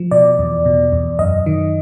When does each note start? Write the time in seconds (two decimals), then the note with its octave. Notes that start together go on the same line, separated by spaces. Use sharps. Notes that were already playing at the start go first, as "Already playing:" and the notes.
Already playing: F3
0.11 B2 D5
0.39 E2
0.66 B2
0.92 E2
1.19 F#2 D#5
1.46 D#3